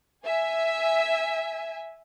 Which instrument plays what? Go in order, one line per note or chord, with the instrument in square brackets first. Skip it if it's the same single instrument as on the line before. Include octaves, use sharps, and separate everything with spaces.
[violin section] E5 G#5